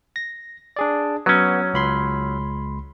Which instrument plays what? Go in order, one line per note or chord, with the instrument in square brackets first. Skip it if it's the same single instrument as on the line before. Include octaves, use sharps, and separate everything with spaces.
[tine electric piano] A#6
D4 G#4 D5
[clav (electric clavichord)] F#3 C#4 [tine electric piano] B3
[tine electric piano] C#2 B5 C6